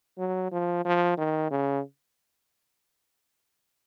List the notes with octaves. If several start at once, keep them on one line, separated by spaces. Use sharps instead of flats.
F#3
F3
F3
D#3
C#3